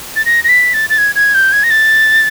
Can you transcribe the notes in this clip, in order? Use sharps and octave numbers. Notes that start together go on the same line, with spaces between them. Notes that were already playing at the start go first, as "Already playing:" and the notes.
A6
A#6
A#6
B6
A6
A6
G#6
G#6
G6
G#6
A#6
A6